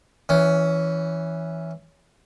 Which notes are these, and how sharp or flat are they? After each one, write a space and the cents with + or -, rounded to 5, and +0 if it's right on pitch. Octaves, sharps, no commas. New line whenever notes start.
E3 +0 C#4 +15